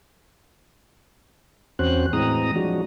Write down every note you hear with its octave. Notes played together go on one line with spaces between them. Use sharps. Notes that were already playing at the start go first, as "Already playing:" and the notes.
E2 C4 C#4 F#4 C5 F#6
A2 E3 G#3 C4 A#5 D#6
F3 F#3 G#3 D4 F#4